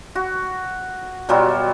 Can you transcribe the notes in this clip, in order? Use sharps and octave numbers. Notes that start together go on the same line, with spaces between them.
F#4
B2 F#3 G3 F4